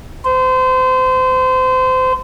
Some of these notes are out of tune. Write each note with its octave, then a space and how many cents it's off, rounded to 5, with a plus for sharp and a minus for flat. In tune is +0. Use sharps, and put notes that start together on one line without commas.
C5 -30